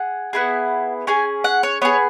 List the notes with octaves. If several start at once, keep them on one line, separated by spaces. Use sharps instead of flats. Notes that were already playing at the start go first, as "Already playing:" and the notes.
Already playing: G#4 F#5
B3 E4 G#4
C#4 G#4 G#5
F#5
C#5
B3 G#4 C#5